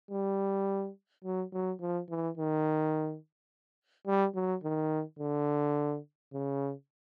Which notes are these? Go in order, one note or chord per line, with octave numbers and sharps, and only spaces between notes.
G3
F#3
F#3
F3
E3
D#3
G3
F#3
D#3
D3
C#3